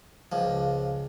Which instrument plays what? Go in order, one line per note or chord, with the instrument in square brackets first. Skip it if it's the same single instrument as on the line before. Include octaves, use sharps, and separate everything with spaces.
[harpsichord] C#2 F3